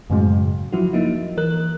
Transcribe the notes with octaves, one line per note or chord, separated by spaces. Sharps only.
F#2 A2 C#3 F#3 G#3
F3 F#3 E4 F#4
A#3 D#4 E4
E3 A#4 F#6